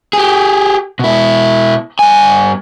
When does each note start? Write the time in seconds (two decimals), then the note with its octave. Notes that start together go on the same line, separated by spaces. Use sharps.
0.13 G4 G#4
0.99 B2 E4
1.99 G2 G#5